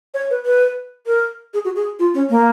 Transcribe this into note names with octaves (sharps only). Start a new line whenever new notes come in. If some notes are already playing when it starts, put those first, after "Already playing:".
C#5
B4
B4
A#4
G#4
F#4
G#4
F4
C#4
A#3